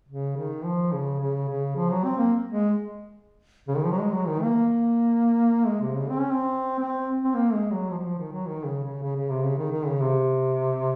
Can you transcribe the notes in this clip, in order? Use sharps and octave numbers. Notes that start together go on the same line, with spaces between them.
C#3
D#3
F3
C#3
C#3
C#3
F3
F#3
C4
A#3
G#3
C#3
D#3
F3
F#3
G#3
F#3
D#3
A#3
G#3
C3
C#3
C4
C#4
C4
C4
C4
A#3
G#3
F#3
F3
F#3
F3
D#3
F#3
D#3
C#3
C#3
C#3
C#3
C3
C#3
D#3
D#3
C#3
C3